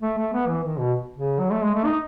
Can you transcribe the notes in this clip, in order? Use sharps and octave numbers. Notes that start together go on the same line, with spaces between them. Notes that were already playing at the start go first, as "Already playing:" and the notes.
A3
A3
B3
E3
D#3
B2
C#3
F#3
A3
G#3
A3
D#4